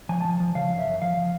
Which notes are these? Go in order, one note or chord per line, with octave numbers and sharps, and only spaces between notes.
F3 G#5
A5
F3
F3
C#3 F5
F#2
E5
F#2
F3 F5
F3